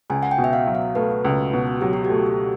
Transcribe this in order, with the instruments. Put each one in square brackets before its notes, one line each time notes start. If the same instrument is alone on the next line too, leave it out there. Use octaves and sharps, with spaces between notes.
[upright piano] C#2 [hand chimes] G#5
[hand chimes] F#5
G5
[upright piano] B2
[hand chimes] E5
F5
[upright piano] F#3
[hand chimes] F5
[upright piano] A3 [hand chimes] B4
[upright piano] C#2
B2
[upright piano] F#3 [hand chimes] G4
[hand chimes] F#4
G4
[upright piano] A3